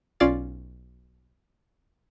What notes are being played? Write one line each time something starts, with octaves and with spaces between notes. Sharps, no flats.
B1 C#4 F4 D5 F5 A6